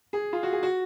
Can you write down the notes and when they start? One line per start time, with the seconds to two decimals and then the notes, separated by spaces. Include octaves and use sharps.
0.13 G#4
0.33 F4
0.43 F#4
0.53 G#4
0.63 F#4